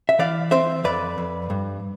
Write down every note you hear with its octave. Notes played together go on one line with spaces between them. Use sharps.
E5
E3 D5 F5
C4 C5 E5
F2 B4 D5
F2
G2